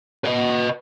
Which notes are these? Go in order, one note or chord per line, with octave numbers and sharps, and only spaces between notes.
B4 D#5